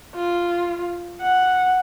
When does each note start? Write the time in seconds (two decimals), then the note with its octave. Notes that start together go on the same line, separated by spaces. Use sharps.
0.15 F4
1.21 F#5